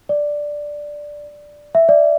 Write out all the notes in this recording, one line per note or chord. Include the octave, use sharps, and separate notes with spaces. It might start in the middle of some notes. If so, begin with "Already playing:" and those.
D5
E5
D5